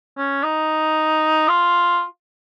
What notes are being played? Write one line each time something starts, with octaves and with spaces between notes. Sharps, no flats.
C#4
D#4
F4